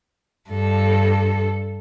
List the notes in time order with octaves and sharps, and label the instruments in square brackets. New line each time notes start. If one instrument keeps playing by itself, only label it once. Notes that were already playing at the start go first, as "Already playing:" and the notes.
[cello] G2 A4